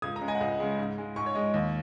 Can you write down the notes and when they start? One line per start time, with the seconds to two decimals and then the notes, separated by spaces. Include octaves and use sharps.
0.02 C#2 D#6 G#6
0.16 A#5 D#6
0.21 C#3 G#3
0.28 D#5 G#5
0.35 F#5
0.40 C#2 D#5
0.60 C#3 G#3
0.79 G#2
0.98 G#3
1.16 G#2 G#5 C#6
1.26 C#5
1.35 G#3 D#5
1.54 D#2